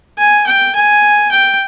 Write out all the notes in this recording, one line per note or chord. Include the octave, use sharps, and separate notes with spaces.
G#5
G5
G#5
G5